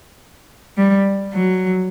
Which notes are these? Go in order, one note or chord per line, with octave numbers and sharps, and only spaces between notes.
G3
F#3